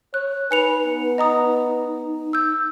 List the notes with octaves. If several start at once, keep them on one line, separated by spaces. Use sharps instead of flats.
C#5 F#6
D#4 B4 G#5 C#7 F7
B3
D#5 A#5 D#6
E6 G6